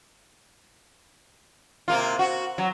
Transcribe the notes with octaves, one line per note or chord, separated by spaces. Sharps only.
C3 A#3 F4
F#4
F#3